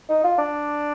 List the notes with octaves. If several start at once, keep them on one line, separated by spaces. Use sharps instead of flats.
D#4
F4
D4